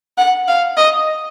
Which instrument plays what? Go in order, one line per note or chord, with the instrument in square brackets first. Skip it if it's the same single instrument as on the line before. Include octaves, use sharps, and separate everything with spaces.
[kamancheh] F#5
F5
D#5